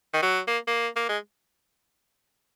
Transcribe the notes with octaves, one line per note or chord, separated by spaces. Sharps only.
D#3
F#3
A#3
A#3
A#3
G#3